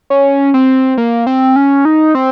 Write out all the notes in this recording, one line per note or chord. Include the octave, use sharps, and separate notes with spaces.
C#4
C4
A#3
C4
C#4
D#4
C4